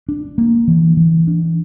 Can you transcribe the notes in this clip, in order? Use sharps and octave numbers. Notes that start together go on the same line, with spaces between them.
D4
A#3
E3
E3
D4